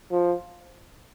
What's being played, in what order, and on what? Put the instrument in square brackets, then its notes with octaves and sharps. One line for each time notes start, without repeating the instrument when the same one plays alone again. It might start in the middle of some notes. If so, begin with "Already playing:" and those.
[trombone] F3